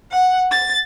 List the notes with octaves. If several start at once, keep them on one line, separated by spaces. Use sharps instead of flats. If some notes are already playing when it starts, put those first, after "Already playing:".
F#5
A6